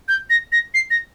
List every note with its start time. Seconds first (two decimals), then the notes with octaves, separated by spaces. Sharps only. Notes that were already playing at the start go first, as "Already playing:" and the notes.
0.08 G6
0.30 A#6
0.52 A#6
0.74 C7
0.91 A#6